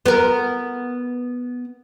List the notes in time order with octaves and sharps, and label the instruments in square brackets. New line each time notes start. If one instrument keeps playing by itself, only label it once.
[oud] B3 A#4